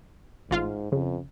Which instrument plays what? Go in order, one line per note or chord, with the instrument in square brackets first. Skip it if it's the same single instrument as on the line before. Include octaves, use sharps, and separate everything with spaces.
[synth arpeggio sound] A1 F4 F5 [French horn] G#2
[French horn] F2 [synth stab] C#3